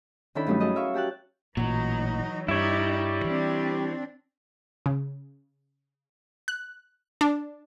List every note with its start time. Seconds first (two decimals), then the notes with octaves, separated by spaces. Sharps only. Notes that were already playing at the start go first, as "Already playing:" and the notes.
0.35 D#3 C#4 D4 E4 A4 B5
0.46 G2 F#3 A3 C#4 D#4
0.60 E4 F#4 G#4 A4 D#5 E5
0.75 A#4 E5 F5 C#6
0.94 F#4 G4 A5 F#6
1.57 A1 A#2 E3 F#3 D#4
2.48 G2 G3 D#4 E4 C#5
3.24 E3 C4 D4
4.86 C#3
6.48 F#6
7.21 D4